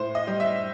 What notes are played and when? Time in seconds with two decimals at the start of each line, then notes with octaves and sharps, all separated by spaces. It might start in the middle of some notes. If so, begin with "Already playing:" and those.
Already playing: A2 C5
0.15 D#5
0.27 G3
0.40 E5